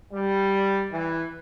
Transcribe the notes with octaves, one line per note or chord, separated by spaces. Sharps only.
G3
E3